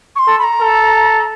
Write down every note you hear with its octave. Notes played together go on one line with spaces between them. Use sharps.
C#6
C6
A4
B5
A#5
A4